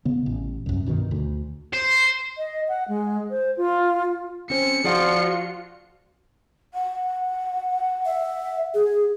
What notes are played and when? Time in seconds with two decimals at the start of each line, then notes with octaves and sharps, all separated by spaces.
0.05 C#3 B3
0.26 A1
0.66 C2 F#2
0.86 G2 B2 D3 D#3
1.11 D2
1.73 C5
2.38 D#5
2.68 F#5
2.88 G#3
3.30 C5
3.57 F4
4.50 C4 C#4 C5 C#7
4.85 F3 F4 F#4 G#4 D5 F#5
6.74 F#5
8.05 E5
8.74 G#4